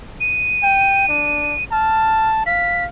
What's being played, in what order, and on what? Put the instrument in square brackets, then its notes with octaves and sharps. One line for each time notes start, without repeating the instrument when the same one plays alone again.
[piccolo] D#7
[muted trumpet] G5
D4
[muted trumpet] A5 [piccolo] F6
[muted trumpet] F5 [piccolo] B6